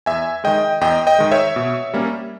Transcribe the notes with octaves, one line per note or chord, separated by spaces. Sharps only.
E2 E5 G#5
D#3 G#3 D#5 G5
E2 D#5 G5
D#5 G5
D#3 G#3
C#5 E5
B2
G3 A#3 C#4